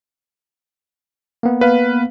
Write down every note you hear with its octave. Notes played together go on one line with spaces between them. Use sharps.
A#3 B3
B4 F5